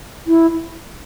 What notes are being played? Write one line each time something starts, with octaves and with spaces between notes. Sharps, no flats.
E4